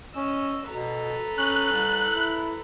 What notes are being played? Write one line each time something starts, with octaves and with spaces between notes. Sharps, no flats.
C#4 D#5 E6
B2 A4 B4 A#5
C#4 F#6
C2
E4